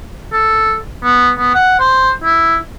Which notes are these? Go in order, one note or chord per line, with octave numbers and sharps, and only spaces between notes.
A4
B3
B3
F#5
C5
E4